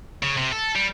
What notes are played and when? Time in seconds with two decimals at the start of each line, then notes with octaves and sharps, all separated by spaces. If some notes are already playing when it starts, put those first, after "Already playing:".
0.23 C#3
0.37 C3
0.52 A4
0.76 G3